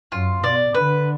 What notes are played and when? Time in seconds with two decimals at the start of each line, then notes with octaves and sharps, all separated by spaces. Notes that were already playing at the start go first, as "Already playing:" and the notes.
0.12 F#2 F4
0.43 B2 D5
0.74 D3 B4